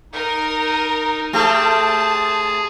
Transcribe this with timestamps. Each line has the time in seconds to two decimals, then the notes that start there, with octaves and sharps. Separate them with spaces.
0.13 D#4 A#4
1.33 A3 C4 G4 G#4 A5